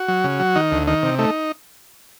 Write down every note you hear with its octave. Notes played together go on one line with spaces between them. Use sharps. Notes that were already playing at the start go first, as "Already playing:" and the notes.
Already playing: F#4
F#3
C#3
F#3
D#3 D#4
D2
D#3 D#4
C3
A3 D#4